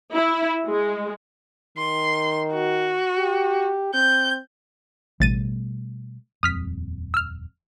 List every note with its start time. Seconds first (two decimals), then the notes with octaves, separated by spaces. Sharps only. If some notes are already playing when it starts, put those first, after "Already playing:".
0.13 E4
0.68 G#3
1.77 D#3 C6
2.53 F#4
3.19 G4
3.94 C4 G6
5.20 A1 B2 G3 A3 A6 D#7
6.43 D#1 F2 D#6 F6 B6
7.14 E6 F6